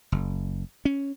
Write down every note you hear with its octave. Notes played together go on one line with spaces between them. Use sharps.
F#1
C#4